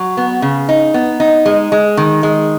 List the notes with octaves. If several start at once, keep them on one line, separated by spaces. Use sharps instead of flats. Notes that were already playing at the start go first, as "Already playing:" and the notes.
Already playing: F#3
B3
C#3
D#4
B3
D#4
G#3
G#3
D#3
G#3